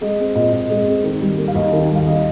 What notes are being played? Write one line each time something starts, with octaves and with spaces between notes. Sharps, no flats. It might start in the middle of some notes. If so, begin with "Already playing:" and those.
G#3 D#5
C4
A#2 D#5
A#2 D#5
G#3
C4
D#3
G3
A#3
F5
D#2 D#5
D#3
G3
F5
D#3 D#5